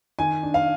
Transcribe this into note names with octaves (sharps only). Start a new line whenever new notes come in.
D#3 G#5
D4
F5